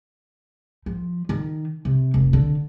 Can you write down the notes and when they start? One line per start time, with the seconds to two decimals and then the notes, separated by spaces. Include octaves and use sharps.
0.86 F3
1.29 D#3
1.85 C3
2.14 F1
2.33 D3